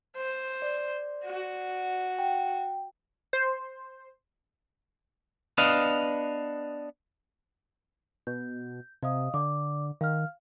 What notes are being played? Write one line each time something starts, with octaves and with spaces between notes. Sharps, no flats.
C5
D5
F#4
G5
C5
B3 D4 B4 D#5 F5
B2 G6
C3 D#5 F5 D#6
D3 D5 D6
D#3 F5 F6